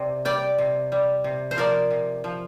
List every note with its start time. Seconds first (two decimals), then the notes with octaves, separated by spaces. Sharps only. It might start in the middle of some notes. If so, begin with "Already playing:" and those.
Already playing: C3 D5
0.25 G3 D5 G5
0.58 C3
0.92 G3
1.24 C3
1.51 C5
1.56 F3 A#4 D5
1.91 C3
2.24 F3